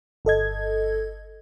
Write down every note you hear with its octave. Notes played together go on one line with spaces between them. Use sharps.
G1 A4 D#5 G#6